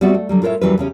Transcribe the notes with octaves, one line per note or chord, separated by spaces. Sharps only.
G3 B3 C4 F#4 D5 E5
A3
D3 F#3 G3
A2 F4 A#4 B4 C#5 E5
D#2 E3 F#3 G3 C#4 B4
E2 C#3 C#4 G4